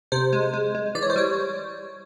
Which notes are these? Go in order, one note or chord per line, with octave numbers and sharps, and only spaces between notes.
C3 C5
G#3
G#3
G#3
E3 D5
C#5
C5
G3 C#5